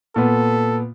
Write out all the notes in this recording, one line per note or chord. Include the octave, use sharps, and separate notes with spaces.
A#2 B3 A4